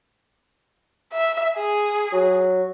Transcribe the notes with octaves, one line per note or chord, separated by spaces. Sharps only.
E5
G#4
F#3